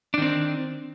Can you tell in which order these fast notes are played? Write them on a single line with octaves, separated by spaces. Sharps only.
D4 D#3 C4